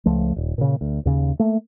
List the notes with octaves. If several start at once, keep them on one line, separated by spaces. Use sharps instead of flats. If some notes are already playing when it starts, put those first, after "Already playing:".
C#2 F3 A3
D#1
A#2 C#3
D2
D#2 C#3
A3 A#3